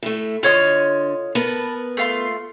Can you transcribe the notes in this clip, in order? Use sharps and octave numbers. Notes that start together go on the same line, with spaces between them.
A2 A3
D3 F4 C#5 D#5
B3 A#4 B4 A5
A3 F4 C6